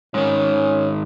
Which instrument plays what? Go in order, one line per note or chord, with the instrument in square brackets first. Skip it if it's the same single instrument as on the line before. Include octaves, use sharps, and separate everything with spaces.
[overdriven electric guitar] G#2 D#3 [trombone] C#4